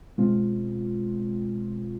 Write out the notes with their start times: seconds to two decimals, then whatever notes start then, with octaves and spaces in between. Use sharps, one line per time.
0.18 B2 G#3 C4 F4